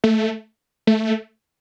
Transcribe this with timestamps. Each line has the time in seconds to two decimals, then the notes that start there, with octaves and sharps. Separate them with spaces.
0.04 A3
0.87 A3